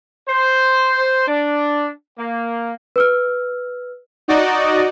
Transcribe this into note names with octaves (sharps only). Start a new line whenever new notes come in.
C5
D4
A#3
B4 E6 F6
D#4 F#4 D5 D#5